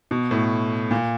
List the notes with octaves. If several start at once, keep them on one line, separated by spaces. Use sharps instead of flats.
B2
A2
A#2